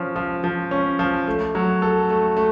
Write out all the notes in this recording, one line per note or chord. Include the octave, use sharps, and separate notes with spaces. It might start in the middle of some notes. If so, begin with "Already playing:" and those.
Already playing: F3 C#4
F3
F3
C#4
F3
A3
F#3
A4
A3
A3